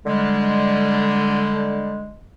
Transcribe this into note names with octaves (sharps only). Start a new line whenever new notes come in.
D3 G3 G#3